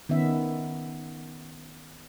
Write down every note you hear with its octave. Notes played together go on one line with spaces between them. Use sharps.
D#3 B3 C#4 E5